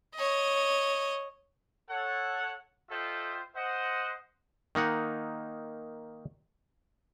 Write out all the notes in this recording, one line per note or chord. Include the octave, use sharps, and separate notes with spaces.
C#5 D#5
A4 C#5 F#5
F4 A4 C5 D#5 E5 G5
C5 D#5 F#5
D#3 A#3 D#4 F#5